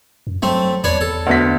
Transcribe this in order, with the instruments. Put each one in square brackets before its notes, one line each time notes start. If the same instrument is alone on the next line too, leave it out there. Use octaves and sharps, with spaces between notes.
[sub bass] F#2
[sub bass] F#3 [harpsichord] A3 C4
[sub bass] E2 [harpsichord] D4 B4 C#5
[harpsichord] A4
[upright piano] D2 B3 B6